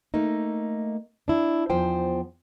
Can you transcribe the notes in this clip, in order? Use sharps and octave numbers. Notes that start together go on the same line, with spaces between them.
A3 A#3 D#4
D4 E4
E2 F3 C5 G5